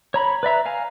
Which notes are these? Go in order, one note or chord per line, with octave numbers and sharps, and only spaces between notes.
C#5 A#5 B5
B4 D5 E5 A#5
F5 G#5 A#5